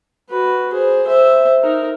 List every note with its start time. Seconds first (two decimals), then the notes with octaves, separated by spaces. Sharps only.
0.30 F#4 B4
0.73 G#4 C5
1.07 C5 E5
1.63 D#4 A#4